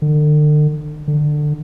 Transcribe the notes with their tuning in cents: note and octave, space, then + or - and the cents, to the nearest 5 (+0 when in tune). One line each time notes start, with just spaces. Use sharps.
D3 +40
D3 +20